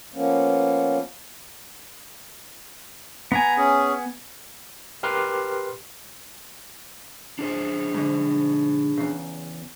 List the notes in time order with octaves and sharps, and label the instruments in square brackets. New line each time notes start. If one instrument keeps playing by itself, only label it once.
[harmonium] F3 A#3 B3 C#4
[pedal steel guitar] B3 G#5 [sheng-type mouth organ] A#5
[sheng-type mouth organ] C#4 G#4
[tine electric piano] G4 A#4 B4 C6 D6 F6
[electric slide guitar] D4 G#4 C5
[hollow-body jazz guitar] G#2 D3
E2 C#3